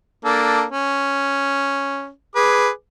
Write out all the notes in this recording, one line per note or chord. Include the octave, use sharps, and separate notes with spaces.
A#3 D4 A4
C#4
G#4 B4 D6